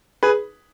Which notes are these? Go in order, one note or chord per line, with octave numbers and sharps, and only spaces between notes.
G#4 B4